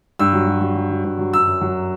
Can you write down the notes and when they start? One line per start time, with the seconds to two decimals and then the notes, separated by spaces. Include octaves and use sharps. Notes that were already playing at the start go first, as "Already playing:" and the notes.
0.19 G2 E6
0.33 F#3
0.47 F#3
0.61 F#3
0.76 F#3
0.90 F#3
1.04 G2
1.19 F#3
1.33 F#2 E6
1.47 F#2
1.61 F#3